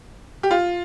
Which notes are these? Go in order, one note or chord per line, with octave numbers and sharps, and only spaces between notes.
G4
F4